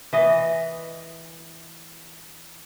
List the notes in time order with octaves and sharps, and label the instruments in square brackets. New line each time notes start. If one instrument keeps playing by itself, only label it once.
[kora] E3 D#5